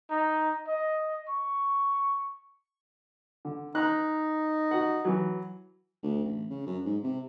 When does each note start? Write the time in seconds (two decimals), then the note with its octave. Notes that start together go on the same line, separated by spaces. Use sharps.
0.10 D#4
0.68 D#5
1.28 C#6
3.45 D3
3.75 D#4 F#6
4.71 F#4 F#5
5.05 E3 F#3
6.03 D2
6.24 A1
6.50 C#3
6.66 F#2
6.85 G#2
7.03 C3